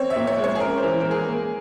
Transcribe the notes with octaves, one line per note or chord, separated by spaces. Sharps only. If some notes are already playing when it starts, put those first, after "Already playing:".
Already playing: C4 C#5
E5
A#2
C#5
G#3
C#5
G#4
C#4 A#4
C5
E3
G#3 A#4
G#4
A#3